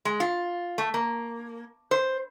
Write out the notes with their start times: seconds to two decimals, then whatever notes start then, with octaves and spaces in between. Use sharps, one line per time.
0.05 G#3
0.20 F4
0.78 A3
0.94 A#3
1.91 C5